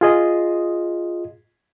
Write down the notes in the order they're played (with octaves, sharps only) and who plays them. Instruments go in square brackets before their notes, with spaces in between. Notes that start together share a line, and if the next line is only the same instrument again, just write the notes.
[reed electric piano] F4 G#4 D#5